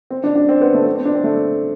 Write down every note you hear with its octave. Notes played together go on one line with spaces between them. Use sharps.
C4
D4
D4
C4
B3
A3
B3
C4
D4
C4
A3